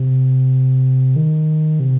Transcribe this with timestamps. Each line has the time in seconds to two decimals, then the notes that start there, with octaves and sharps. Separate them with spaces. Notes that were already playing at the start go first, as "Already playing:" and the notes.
Already playing: C3
1.16 D#3
1.80 C3